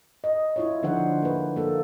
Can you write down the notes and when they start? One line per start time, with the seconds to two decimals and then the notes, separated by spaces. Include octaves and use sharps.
0.24 D#5
0.56 E4 F4 C#5
0.83 D3 F3 D4 D#4 C5 F#5
1.22 A#3 B4
1.56 A#3 A4